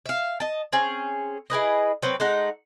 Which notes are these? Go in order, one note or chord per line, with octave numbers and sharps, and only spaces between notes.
E5 F5
D#5 A5
C4 C#4 G#4
E4 G#4 B4 D#5
F#3 C4 B4
G#3 A3 D#4 F#5